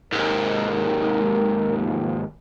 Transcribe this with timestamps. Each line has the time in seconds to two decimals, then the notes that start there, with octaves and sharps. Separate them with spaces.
0.13 D#2 G#2 A#4
1.77 F3 A3 A#3